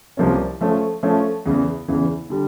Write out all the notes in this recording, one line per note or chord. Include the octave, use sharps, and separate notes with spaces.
C2 C3 F3 A#3 C#4
F3 A3 C#4
F3 A3 C#4
E2 C#3 E3
E2 C#3 E3
D3 G3